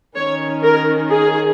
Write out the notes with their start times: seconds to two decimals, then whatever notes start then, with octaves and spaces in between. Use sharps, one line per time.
0.17 D#3 C#4 C#5
0.63 A#4
1.10 G#4